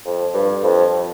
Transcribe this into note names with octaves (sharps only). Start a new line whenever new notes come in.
F2
G2
F2